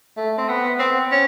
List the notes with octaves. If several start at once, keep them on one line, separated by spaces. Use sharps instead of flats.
A3
C4
B3
C4
C#4